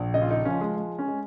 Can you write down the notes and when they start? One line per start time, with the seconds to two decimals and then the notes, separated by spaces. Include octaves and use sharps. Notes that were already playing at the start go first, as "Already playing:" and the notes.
Already playing: A#1
0.14 C#3 D#5
0.22 F4
0.31 D#4
0.45 F3 C#4
0.61 G#3
0.76 G#3
0.99 C#4
1.08 G#3